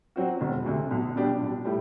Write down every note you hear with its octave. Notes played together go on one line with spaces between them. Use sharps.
F#3 C4 F#4
E1
D2 C3
B1
B2 G3 D4 G4
B1
A2 G3